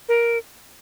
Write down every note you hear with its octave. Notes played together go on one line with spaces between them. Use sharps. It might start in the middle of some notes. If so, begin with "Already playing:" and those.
A#4